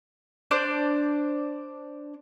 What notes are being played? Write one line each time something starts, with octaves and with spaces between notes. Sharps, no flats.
D4 C5 D5